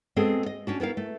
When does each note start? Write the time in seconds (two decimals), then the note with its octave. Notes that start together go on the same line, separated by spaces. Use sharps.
0.16 G#3 B3 C4 F#4 G#4 A4
0.46 D#5
0.67 C#4 D4 F#4
0.80 B3 E4 A#4 F5
0.97 A3